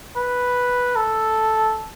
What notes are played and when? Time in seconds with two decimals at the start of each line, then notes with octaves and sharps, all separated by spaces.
0.16 B4
0.96 A4